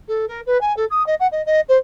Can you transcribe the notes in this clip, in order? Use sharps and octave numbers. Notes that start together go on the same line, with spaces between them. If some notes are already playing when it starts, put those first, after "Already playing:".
A4
A#4
B4
G#5
A4
D#6
D#5
F#5
D#5
D#5
C5